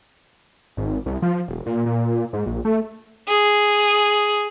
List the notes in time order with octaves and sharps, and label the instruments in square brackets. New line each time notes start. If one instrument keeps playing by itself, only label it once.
[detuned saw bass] G#1
C2
F3
E1
A#2
A#2
G#2
A#1
A3
[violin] G#4